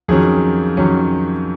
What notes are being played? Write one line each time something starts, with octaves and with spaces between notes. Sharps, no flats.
F2 D#3 F#3 C#4 G#4
F2 D#3 F#3 C#4